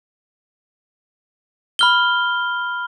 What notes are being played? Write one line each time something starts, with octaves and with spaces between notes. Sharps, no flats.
B5 F6 G7